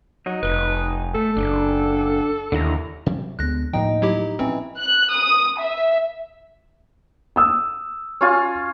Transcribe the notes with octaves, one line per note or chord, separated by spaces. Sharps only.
F#3 D#4 D#5
F1 B4
A3 A4
F#1 D4
D#2 D3 E4 A#5
C3 F#3 G3
D2 D3 G#3 B3 F#6 A#6
D2 A2 F3 A3 A#3 D#4 G5
F#3 E4 G4
A#1 E3 C4 C#4
F#6
D#6
E5
D#6 E6
C#4 F4 G#5